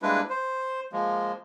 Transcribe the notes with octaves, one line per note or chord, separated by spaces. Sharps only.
G3 G#3 A#3 D4 E4 B4
C5
F3 G#3 A#3